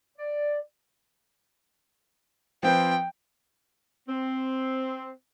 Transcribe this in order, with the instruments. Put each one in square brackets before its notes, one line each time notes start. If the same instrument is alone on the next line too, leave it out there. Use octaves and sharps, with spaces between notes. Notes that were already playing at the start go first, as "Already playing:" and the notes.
[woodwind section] D5
[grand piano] F3 C4 B4 [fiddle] G5
[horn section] C4